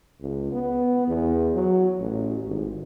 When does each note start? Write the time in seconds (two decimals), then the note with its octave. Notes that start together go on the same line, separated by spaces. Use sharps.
0.21 C#2
0.52 B3
1.08 E2
1.54 F#3
2.00 A1
2.46 G#1